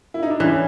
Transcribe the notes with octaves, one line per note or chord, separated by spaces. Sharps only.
E4
D#4
D4
E3 C#4